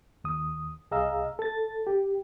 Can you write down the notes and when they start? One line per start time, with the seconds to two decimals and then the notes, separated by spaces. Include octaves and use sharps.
0.24 D#2 D#6
0.91 C2 G#4 D#5 F5 A#5 E6
1.39 A4 A6
1.87 G4